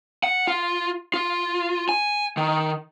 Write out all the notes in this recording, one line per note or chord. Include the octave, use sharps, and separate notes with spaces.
F#5
F4
F4
G#5
D#3